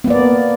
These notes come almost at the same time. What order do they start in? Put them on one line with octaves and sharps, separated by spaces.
B3 A#3 D5